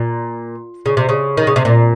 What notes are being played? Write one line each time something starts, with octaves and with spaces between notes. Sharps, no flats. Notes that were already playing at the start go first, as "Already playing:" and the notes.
Already playing: A#2
C#3
C3
C#3
D#3
C#3
C3
A#2